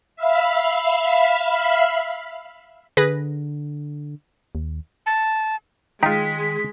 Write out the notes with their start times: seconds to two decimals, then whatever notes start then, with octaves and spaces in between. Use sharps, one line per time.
0.16 E5 F5 B5
2.97 D3 G#4 B4 A#6
4.55 D#2
5.06 A5
6.03 D#3 G#3 D#4 F4 G5 A#5 B6